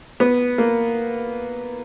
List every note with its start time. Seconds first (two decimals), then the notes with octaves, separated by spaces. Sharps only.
0.20 B3
0.58 A#3